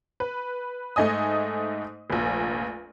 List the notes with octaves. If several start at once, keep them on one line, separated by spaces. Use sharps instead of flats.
B4
G#2 A3 D#4 D#5 G#5 D#6
F1 A#1